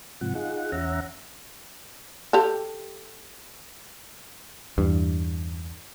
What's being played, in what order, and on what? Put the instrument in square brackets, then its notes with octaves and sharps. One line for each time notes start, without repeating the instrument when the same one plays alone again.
[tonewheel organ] G#2 C3 F3 F#5
D#4 F4 G#4 F#5
E2 C#4 E5 F#5 A#5
[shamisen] G4 A4
[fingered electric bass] E2 [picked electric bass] G2